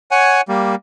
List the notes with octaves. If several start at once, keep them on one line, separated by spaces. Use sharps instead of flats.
C#5 F#5 G#5
G3 A#3